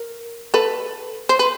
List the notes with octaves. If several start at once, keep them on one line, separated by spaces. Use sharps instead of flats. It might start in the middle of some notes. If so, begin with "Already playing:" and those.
Already playing: A#4
A4 B4
C5
B4